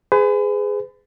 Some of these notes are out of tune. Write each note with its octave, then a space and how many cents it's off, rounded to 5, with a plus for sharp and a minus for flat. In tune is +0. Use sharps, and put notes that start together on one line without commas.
G#4 +0 B4 +40